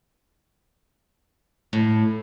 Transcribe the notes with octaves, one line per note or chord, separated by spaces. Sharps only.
A2